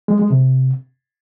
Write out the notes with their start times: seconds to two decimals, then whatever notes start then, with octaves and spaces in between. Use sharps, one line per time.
0.08 G#3
0.19 G#3
0.30 C3